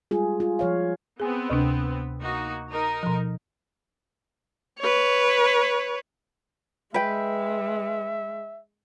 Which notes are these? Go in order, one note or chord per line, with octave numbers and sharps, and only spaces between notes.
G3 G#3 F4 G#4
F4
F3 C#5 F5
B3 C4 G#4 G#5
D2 C3 D4
A#3 D#4 F#4
D#4 A#4
B2 F3
B4 C#5
G#3 B4 E5 G5